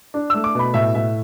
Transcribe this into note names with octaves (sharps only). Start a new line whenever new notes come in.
D4
A3 E6
D6
B2 B5
A2 E5
A2 E5